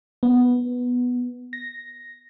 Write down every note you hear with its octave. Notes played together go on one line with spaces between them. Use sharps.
B3
A#6